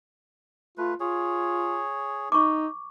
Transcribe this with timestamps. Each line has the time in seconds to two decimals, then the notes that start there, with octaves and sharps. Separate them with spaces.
0.78 A3 F4 B4
1.00 F4 G#4 C#5
2.32 D#4 C#6 D6